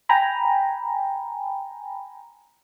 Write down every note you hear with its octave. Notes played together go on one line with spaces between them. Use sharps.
G5 G#5 A#5 B5